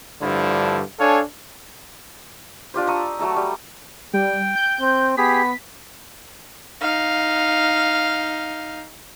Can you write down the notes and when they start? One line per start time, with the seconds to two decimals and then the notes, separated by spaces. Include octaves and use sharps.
0.22 G2 D3 F3 A3 E4
1.00 D4 A4 C#5 F5 G#5
2.74 D4 F4 G4 C5
2.87 A#5 C#6 D#6 E6
3.19 F#3 A3 A4 A#5
3.36 G3
4.13 G3 G5
4.55 G6
4.80 C4
5.17 B3 G4 G#4 B6
6.81 D#4 F5